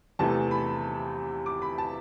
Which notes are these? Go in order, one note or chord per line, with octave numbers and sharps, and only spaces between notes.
E2 C3 E3 A3 A5
B5
D6
B5
A5